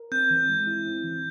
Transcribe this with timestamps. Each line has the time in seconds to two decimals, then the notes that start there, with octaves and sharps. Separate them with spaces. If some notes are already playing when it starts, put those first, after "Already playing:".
Already playing: A#4
0.12 C4 G6
0.30 E3
0.49 G#3
0.67 E4
0.85 C4
1.04 E3